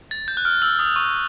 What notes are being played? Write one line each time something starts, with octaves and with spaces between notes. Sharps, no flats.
A6
G6
F#6
F6
E6
D#6
C#6